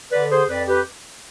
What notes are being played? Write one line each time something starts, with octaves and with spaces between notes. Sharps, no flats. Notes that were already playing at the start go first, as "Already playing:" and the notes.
D3 B4 D5
G#4 C5
F2 B4 D5
G4 B4